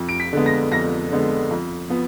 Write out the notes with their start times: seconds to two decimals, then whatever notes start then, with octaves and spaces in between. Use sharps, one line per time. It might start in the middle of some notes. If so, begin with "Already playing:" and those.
Already playing: F2
0.09 D7
0.20 B6
0.33 D3 G#3 B3
0.46 A#6
0.72 F2 A#6
1.11 D3 G#3 B3
1.51 F2
1.90 F3 B3